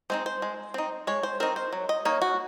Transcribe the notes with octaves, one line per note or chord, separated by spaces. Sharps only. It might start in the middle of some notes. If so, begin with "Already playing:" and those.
G#3 C4 D#4 C5
C5
G#3
C4 D#4
G#3 C#5
C5
C4 D#4 A#4
C5
F#3
D#5
A#3 D#4 C#5
F#4